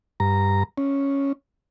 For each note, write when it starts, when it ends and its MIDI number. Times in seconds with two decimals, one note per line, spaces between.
0.20 0.63 43
0.20 0.63 82
0.78 1.32 61